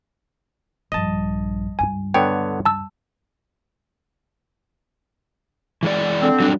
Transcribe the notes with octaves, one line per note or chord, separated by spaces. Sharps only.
A#1 G2 D#5 A5
C#2 G2 G#5
D3 B3 C#5 G5
A5 E6
E3 G#3 D5
D3 C4
F#3 G3 D4